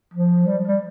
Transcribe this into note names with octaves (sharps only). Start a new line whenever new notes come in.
F3
G3
G3